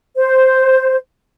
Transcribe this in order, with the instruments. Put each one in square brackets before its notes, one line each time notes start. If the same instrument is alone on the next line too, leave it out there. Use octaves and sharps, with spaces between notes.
[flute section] C5